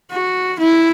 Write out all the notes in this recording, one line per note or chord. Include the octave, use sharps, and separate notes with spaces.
F#4
E4